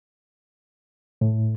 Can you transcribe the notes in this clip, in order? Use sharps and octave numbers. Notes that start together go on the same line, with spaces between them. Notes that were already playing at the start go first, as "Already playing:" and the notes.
A2